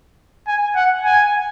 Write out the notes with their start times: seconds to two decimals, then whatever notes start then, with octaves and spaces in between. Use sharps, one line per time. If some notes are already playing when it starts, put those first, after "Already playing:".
0.47 G#5
0.76 F#5
1.04 G#5